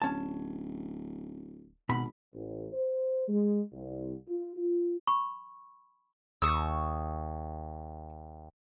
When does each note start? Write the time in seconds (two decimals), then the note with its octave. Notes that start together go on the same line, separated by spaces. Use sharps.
0.02 D1 C#4 A5
1.89 G#1 B2 B5
2.34 A1
2.73 C5
3.29 G#3
3.72 C2
4.28 F4
4.57 F4
5.07 B5 C#6
6.42 D#2 C#6 D#6 E6